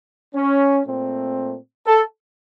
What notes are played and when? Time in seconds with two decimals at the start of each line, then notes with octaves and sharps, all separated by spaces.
0.35 C#4
0.86 A#2 A3 C4
1.87 A4